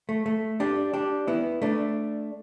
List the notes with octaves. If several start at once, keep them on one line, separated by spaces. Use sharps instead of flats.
A3
A3
D4 G4
D4 G4
B3 E4
A3 D4